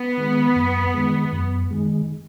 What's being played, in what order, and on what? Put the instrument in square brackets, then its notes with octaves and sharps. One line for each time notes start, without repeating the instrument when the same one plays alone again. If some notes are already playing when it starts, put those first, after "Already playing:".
Already playing: [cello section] B3
[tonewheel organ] D#3 G#3
F#2
D#3 G#3
F#2
D#3 G#3